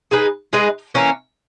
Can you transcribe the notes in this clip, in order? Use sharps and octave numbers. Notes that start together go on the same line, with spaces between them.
G#3 D#4 G#4 B4
G#3 D#4 G#4 B4
E3 A#3 C#4